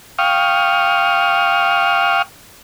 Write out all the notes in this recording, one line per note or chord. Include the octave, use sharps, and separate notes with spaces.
F5 G5 C#6 D#6 F6